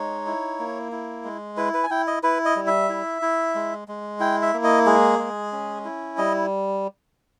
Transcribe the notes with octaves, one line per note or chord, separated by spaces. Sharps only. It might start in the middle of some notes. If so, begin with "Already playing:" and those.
Already playing: G#3 D#4 C#5
E4
A#3
E4
G#3
E4 B4
B4
G#5
E4 G5
D#5
E4 B4
D#5
G3
E5
E4
E4
G#3
G#3
E4 G5
E5
A#3
D#5
G#3 G#4
G#3
C#4
E4
G3 D#5